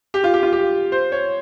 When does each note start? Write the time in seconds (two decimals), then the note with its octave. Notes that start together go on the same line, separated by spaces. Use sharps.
0.14 G4
0.24 F4
0.34 G4
0.43 F4
0.53 G4
0.92 C5
1.12 C#5